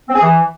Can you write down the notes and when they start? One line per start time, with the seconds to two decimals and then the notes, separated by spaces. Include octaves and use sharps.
0.08 C4
0.15 G#4
0.22 E3